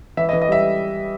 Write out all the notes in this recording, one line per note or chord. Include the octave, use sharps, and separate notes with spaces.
E3 E5
D#5
E3
D#5
G3 E5